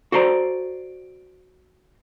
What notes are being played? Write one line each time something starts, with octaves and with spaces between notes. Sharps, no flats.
F#4 A4 C5 D5 A#5